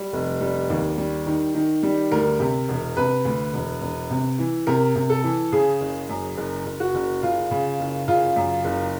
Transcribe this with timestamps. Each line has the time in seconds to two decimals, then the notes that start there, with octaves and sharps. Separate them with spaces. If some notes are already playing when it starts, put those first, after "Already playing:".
Already playing: G3
0.13 F1
0.41 G3
0.70 D#2
0.98 G3
1.26 D#3
1.55 D#3
1.83 G3
2.11 D2 A#4
2.40 C3
2.69 E1
2.97 C3 B4
3.25 D2
3.54 E1
3.82 E1
4.10 C3
4.39 E3
4.67 C3 A#4
4.95 C3
5.10 A4
5.24 E3
5.52 C#3 G#4
5.81 F#1
6.09 F#2
6.37 F#1
6.66 F#1
6.80 F#4
6.94 F#1
7.23 C#3 F4
7.51 C#3
7.80 F#1
8.08 C#3 F4
8.36 F#2
8.65 F#1